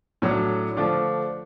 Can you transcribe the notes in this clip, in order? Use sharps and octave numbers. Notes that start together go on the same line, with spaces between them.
A2 F#3 A3 D4 F#4
D3 F3 A3 D4